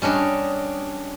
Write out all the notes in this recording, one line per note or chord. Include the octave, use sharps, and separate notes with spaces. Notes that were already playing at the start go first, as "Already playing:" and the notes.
G3 C#4 D4 D#5